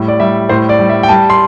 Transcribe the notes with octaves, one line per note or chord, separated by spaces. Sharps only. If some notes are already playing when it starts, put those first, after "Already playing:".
Already playing: A2 G3
D5
G3 E5
A2 C5
D5
G3
E5
G5
G3 A5
C6